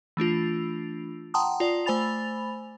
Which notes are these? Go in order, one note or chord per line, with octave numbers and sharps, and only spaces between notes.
E3 A3 D4 F4
F#5 G5 A5 A#5 C6 D#6
F4 D5
A3 C5 G#5 B5 A6 F7